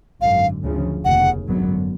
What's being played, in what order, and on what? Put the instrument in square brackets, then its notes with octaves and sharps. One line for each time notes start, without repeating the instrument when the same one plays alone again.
[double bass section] G#1 F#2 D3 [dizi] F5
[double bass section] D2 C#3 F3
[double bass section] F1 D#2 C#3 [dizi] F#5
[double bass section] G#1 F#2 D3 F#3 B3